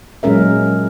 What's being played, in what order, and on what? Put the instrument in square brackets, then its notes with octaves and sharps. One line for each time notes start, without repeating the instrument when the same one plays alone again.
[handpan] A#2 F#3 G#3 C#4 A#4 E5